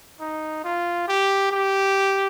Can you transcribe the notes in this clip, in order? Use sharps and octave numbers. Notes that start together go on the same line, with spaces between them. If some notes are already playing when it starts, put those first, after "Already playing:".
D#4
F4
G4
G4